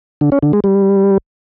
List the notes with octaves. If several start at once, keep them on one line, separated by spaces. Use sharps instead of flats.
D3
C#4
D3
G#3
G3